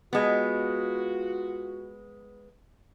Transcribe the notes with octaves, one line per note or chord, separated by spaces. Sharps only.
G#3 B3 F4 F#4